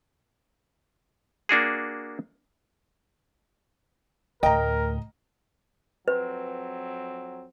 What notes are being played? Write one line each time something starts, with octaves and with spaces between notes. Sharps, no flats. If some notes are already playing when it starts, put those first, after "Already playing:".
A#3 D4 F#4 G#4
D2 A2 A#4 D#5 G5 A#5
F2 F#3 C4 B4